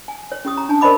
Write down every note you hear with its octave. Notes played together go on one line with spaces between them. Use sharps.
G#5
C#5
C#4 G4 D#6
A#5
D4 G#5 A5
A#4 C5 D5 D#5 B5 D6